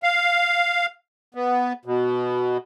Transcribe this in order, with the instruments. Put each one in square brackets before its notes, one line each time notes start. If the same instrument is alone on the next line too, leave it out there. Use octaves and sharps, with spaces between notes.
[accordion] F5
B3
B2